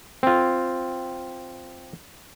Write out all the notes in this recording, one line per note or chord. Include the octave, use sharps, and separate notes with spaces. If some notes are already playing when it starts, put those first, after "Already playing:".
C4 F4